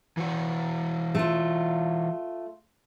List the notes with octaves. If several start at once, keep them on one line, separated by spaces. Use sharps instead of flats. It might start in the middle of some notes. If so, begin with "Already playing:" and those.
E3 F#4
A3 F4